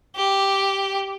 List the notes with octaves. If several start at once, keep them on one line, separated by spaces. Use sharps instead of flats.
G4